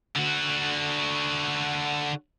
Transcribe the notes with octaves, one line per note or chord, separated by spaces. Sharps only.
D3 F#4